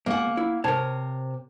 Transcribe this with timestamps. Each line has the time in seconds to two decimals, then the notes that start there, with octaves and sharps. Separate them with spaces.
0.06 C#2 A#3 F#5
0.37 E4
0.64 C3 A#4 C#5 A5